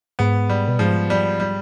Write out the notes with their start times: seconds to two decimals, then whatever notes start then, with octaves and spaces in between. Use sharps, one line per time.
0.19 G#2 B3
0.50 G3
0.68 B2
0.79 G#2 F3
1.10 G3
1.40 G3